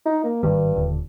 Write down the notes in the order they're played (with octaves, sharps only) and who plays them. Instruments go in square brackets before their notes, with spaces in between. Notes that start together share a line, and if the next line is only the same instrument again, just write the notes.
[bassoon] D#4
A#3
[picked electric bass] G#1 D#3 G3 [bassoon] G2
[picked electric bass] D#1 D3